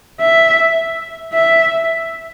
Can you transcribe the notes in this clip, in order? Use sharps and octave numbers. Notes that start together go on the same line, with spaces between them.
E5
E5